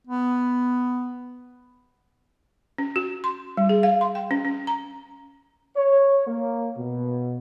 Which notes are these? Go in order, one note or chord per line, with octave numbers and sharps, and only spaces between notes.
B3
C#4
F#4
C6
G3
G#4
F5
C6
G5
C#4
C#4
A#5
C#5
A#3
B2